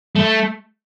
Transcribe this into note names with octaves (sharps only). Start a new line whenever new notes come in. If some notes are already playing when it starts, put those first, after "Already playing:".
A3